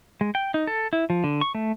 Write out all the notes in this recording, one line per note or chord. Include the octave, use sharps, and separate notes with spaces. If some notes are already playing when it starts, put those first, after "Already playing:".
G#3
G5
D#4
A4
E4
F3
D3
C#6
A3